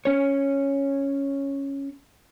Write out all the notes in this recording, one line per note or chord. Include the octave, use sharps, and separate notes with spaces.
C#4 C#5